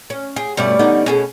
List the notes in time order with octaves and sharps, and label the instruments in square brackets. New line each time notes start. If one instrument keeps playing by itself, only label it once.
[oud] C#4
[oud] G4 [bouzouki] G#4
[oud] G2 B2 A3 [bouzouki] G3 C#4 D5
[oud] D3 B3 D#4
[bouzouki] B2 [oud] C#4 G#4 A4